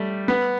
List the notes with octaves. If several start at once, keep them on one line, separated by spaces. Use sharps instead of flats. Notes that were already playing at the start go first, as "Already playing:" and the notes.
Already playing: G3 A3
B3